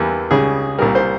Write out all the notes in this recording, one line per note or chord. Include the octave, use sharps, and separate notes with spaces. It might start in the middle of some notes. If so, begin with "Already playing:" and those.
Already playing: E2 E3 G3 A#3
C#2 C#3 G3 G#4
C2 A#2 G3 A#4
C5